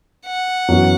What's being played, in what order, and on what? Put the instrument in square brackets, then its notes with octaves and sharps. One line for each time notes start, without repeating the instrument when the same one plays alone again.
[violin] F#5
[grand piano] F#2 E3 B3 F#4